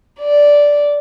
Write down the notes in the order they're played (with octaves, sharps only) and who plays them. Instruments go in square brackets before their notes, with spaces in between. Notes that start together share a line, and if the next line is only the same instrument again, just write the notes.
[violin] D5